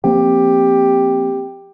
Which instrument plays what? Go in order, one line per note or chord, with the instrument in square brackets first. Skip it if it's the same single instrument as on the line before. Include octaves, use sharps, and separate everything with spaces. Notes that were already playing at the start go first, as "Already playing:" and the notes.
[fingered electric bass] F3 A#3 C4 [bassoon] G4